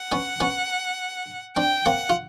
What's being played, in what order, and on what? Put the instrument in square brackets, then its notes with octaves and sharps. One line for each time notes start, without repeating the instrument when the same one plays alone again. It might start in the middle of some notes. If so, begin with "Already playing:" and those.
Already playing: [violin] F#5
[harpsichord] B3 C#4
B3 C#4
[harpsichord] C4 D4 [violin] G5
[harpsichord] A#3 C4 [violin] F#5
[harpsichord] F4